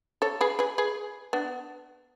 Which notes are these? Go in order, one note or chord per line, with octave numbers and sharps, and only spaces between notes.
A4 C#5
G#4 B4
G#4 B4
G#4 B4
B3 D4